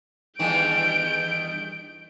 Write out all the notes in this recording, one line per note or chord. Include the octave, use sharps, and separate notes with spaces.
E2 G2 D#3 G6 D7